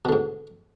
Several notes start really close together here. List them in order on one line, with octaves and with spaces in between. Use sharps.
B2 D3 G#2